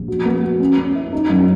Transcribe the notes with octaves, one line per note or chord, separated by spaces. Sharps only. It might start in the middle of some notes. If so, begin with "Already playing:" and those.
Already playing: A#1
F#4
B3
F#4
C#4
C#4
E4
D#4
F#2